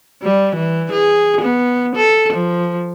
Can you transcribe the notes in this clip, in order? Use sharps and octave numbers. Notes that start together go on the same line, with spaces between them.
G3
E3
G#4
B3
A4
F3